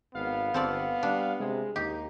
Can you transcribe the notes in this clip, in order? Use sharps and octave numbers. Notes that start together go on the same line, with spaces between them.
G#1 B3 F5
G1 C4 A4 D5
G3 D4
C3 G#3
D#2 D#4 G4